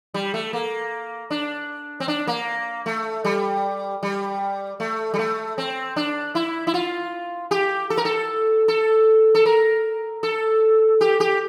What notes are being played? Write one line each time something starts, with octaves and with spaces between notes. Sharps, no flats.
G3
A3
A#3
D4
C4
D4
A#3
A3
G3
G3
A3
G3
A3
C4
D4
E4
E4
F4
G4
A4
A#4
A4
A4
A4
A#4
A4
G4
G4